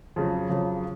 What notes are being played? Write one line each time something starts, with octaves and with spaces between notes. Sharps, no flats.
F2 C#3 F#3
F2 C#3 F#3